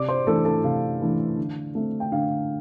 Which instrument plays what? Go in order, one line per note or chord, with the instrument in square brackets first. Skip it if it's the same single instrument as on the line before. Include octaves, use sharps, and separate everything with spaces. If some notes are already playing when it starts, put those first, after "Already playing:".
Already playing: [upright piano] C3 D5 D6
C5 C6
E3 A3 D4 A4 A5
A4 A5
C3 F5
E3 A3 D4
D3
A3 C4
G5
D3 F5